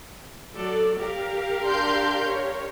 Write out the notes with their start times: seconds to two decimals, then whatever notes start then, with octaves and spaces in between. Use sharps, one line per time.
0.56 F#3 A4 D5
1.01 G4 A#4 F5
1.64 D4 C6 G6
2.26 C#5